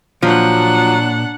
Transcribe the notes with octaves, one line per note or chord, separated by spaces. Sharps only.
A#2 F3 F#3 D4 F#5